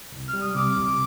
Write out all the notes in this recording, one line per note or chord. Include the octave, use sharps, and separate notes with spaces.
C2
F6
G3
D#6
C3 D6
C2